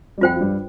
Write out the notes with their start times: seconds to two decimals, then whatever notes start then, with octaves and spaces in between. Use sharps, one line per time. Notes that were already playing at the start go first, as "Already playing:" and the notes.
0.18 G3
0.21 F2 F3 F4 C5 G5
0.35 F3
0.40 G2 G3